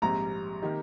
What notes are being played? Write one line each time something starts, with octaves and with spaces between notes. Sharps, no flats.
A#1 G#2 G3 C4 G4 A#5
D#3 A#3 D#4 G4